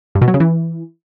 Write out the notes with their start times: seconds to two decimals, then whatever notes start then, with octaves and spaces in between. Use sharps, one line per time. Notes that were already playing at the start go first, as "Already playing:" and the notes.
0.15 G2
0.21 B2
0.28 F#3
0.34 C#3
0.40 E3